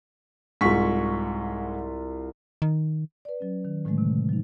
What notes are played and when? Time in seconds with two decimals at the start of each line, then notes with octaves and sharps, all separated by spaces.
0.61 C2 G#2 F4 C#6 B6
2.62 D#3
3.25 B4 D5
3.40 F#3 C#4
3.65 D#3
3.85 A2 D3 D#3 F#3 G#3 A3
3.98 C3
4.29 F#3 D#4